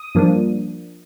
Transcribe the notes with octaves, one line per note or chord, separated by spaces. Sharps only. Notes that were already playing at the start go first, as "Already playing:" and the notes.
Already playing: D#6
G2 F3 A#3 D4